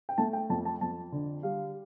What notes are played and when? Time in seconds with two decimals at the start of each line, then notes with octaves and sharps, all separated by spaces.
0.09 G5
0.18 A3 A5
0.33 G5
0.50 F2 A5
0.65 A5
0.81 F2 A5
1.12 D3
1.43 G3 F5